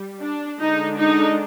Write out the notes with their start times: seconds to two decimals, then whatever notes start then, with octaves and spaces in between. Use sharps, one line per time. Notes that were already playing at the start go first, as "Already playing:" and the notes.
Already playing: G3
0.21 D4
0.59 D3 G#3 D4 D#4
0.96 D#4